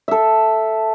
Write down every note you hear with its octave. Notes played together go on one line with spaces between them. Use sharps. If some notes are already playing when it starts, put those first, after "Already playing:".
A4 E5